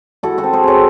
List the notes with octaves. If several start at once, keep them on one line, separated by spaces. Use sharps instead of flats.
E4 F#4 A4
F#4 A4
C4
G#4 C5
C4 A4 C#5